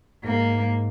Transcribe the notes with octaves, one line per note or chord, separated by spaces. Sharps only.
G#2 A#3